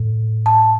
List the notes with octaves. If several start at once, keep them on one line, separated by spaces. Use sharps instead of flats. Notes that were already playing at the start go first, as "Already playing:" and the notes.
Already playing: A2
A5